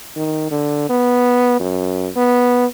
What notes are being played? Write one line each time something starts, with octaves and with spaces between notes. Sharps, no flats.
D#3
D3
B3
F#2
B3